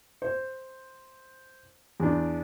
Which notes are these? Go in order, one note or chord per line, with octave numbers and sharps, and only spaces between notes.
C5
E2 D4